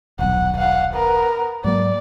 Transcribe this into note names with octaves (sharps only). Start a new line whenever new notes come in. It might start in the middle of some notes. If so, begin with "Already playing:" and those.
D#1 B1 F#5
F5 F#5
B3 A#4
G#2 F#3 A#3 D5